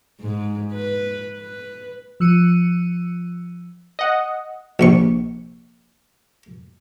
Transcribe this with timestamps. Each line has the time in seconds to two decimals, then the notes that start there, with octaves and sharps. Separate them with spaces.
0.21 G#2
0.73 B4
1.38 B4
2.20 F3 E6 F#6 C#7 D#7
3.99 D#5 F#5
4.79 A#1 C3 C#6